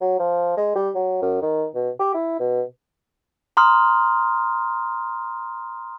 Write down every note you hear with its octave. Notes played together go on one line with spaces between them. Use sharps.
F#3
F3
G#3
G3
F#3
F#2
D#3
B2
G4
E4
B2
A#5 C6 D#6 F6